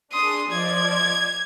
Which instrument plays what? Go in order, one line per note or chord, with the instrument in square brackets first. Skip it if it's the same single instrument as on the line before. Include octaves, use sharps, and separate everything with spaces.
[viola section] D4 G#4 [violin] C6 D#6
[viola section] F3 D5 D#5 [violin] G#6